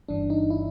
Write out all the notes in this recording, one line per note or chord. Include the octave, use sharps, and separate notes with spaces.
G1 G2 E3 D4
D#4
E4